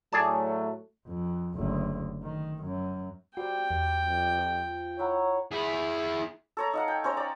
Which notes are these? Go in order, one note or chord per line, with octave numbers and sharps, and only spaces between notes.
A2 F#3 A3 G#4 D5 A5
F2
F#1 D2
D#3
F#2
G3 F#4 C5 G5
E2
F2
F3
E4 C#5 F#5 A#5
E4 G#4
A4 C#5 A#5
D#4 F5 F#5
G5
C#4 C5 C#5 A#5
D5